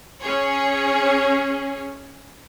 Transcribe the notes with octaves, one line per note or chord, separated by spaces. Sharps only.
C#4 G#4 C#5